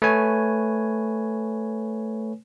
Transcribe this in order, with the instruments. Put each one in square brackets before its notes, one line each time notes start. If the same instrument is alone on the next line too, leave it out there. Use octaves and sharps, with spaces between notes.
[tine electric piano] A3 B4 C#5 G#5